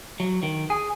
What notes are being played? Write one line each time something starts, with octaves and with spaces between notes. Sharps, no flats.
F#3
D#3
G#4